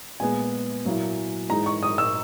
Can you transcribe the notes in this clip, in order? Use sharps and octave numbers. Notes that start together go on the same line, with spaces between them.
A#2 G#3 B3 G#5
A#2 F#3 A#3 E4
G#2 E3 G#3 D#4 A#5
C#6
D#6
E6